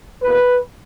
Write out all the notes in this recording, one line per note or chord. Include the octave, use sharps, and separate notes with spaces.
E2 B2 A#3 B4